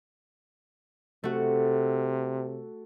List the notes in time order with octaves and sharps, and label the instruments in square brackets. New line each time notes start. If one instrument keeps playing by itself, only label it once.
[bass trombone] C3 [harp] A3 F#4